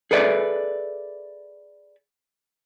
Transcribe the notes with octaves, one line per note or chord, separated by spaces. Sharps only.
G#4 A4 B4 D5 E5